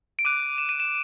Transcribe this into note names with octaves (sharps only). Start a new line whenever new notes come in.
D7
D6 F#6 D#7
E7
D#7
E7